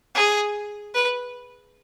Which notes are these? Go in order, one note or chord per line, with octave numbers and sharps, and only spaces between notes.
G#4
B4